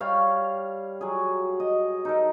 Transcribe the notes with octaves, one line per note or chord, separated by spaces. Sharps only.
G3 C#5 F5
F#3 G#4
D#5
D#4 A4 A#4